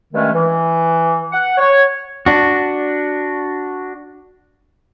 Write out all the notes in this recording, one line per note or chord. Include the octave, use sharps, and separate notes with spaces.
G2 D#3 G#3 A3 C#4
E3
F#5
C#5
D4 F#4